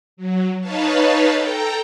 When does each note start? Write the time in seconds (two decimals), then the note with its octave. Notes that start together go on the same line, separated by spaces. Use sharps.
0.17 F#3
0.60 D#4 B4 C#5 F5 A5
1.35 A4 G5 A#5